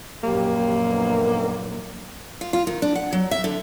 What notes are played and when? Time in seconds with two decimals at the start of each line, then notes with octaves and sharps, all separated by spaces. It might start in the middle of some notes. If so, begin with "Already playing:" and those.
0.23 A#1 F#2 A#3 G4
0.87 D3 D#3 B3
2.41 F4
2.53 F4
2.67 D#3
2.82 D4
2.95 F#5
3.13 F#3
3.31 E5
3.44 D3